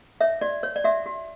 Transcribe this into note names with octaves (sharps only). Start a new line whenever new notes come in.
C#5 E5
F#4 D5
C#5
D5
F#4 E5
F#4